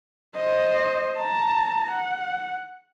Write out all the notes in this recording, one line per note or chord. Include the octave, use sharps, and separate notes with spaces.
C5 D#5
A5 A#5
F#5